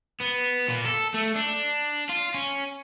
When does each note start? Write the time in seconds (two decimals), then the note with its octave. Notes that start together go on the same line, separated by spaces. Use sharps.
0.21 B3
0.69 A#2
0.86 A4
1.14 A3
1.36 D4
2.10 F4
2.34 C#4